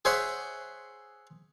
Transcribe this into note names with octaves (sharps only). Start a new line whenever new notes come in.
G#4 C5 C#5 E5 F#5 C6